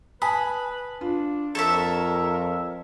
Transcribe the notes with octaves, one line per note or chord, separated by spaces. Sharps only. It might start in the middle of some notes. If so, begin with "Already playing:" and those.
B4 G#5 A5 B5 D#6
D4 F4
F2 A4 A#4 C#5 E5